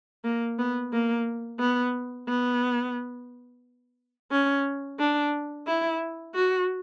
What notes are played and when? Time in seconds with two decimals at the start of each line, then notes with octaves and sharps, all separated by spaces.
0.24 A#3
0.59 B3
0.93 A#3
1.60 B3
2.28 B3
4.32 C#4
4.99 D4
5.67 E4
6.35 F#4